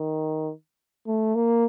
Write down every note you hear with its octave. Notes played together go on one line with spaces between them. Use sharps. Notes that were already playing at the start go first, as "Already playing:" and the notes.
Already playing: D#3
A3
A#3